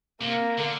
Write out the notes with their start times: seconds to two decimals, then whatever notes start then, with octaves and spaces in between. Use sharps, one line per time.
0.21 C3 A#3
0.58 D3